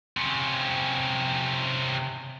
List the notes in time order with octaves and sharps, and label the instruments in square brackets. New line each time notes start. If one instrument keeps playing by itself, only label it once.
[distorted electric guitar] C3 C#4